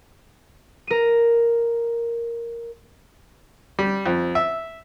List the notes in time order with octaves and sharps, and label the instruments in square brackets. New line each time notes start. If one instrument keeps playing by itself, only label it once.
[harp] A#4 D#7
[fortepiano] G3
F2
E5